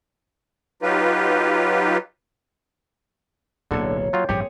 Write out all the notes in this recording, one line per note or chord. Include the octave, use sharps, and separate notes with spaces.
F#3 D#4 F4 G4 B4
D1 B1 D3 A#3 C#5
F#3 F4 G5
A1 G2 F3 C4 G4 G#4 C#5